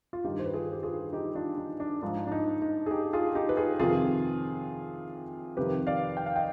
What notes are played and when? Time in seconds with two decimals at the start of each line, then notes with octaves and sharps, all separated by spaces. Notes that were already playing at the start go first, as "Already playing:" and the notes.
0.13 F4
0.24 G2 D#3 D#4 G4
0.39 C5
0.46 B4
0.54 F4 G#4
0.72 G4
0.83 F4 G#4
1.13 D#4 G4
1.35 D4 F4
1.58 D#4
1.80 D4
2.02 G#2 F3 D4
2.27 D4
2.32 D#4
2.62 D#4
2.86 G#4
2.91 D#4 G4
3.13 F4 G#4
3.35 D#4 G4
3.49 B4
3.57 F4 G#4
3.80 F2 C3 D#3 F4 G#4
5.57 F2 C3 D#3 G4 B4
5.87 D5 F5
6.17 G5
6.26 F5
6.36 D#5 G5